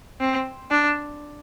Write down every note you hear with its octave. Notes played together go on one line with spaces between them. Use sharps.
C4
D4